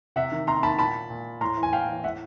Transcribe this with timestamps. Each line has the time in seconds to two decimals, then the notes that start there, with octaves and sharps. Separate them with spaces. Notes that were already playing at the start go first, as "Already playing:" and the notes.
0.16 C3 E5 F#5
0.32 D#3
0.47 C3 A#5 C6
0.63 D#3 A5 B5
0.78 A#2 A5 B5
1.10 A#2
1.41 A2 A#5 C6
1.57 E3
1.63 G#5
1.73 A2 F5 G5
1.88 E3
2.04 A2 E5 F#5